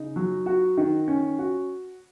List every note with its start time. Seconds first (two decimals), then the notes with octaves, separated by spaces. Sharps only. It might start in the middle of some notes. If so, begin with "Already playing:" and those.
Already playing: C#3 D#4
0.16 F#3
0.46 F#4
0.78 D#3
1.08 C#4
1.39 F#4